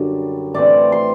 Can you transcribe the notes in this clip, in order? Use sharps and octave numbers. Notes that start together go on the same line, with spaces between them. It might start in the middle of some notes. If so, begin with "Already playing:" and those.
Already playing: F#2 D3 G3
A2 E3 A3 C4 D5
C6